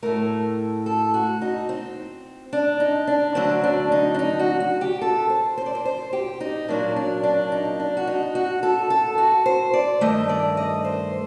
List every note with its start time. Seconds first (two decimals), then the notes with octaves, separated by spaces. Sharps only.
0.02 A2 A3 A#4
0.86 A4
1.14 F#4
1.41 D#4
1.69 C4
2.53 D4
2.80 D#4
3.07 D4
3.35 D2 D3 F#3 C4
3.64 D4
3.92 D#4
4.14 D4
4.19 D#4
4.39 F#4
4.60 F#4
4.81 G4
5.02 A4
5.30 C5
5.58 C5
5.66 D5
5.75 C5
5.85 C5
6.13 G4
6.40 D#4
6.68 A#2 F#3 A#3 D4
6.96 D4
7.23 D4
7.52 D#4
7.80 D4
7.97 F#4
8.07 D#4
8.35 F#4
8.63 A4
8.90 A4
9.18 F#4
9.46 C5
9.74 D5
10.01 G2 D#3 A3 D#5
10.29 D5
10.57 D#5
10.85 C5